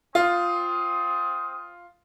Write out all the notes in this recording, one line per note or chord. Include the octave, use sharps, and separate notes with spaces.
C4 F4 D#6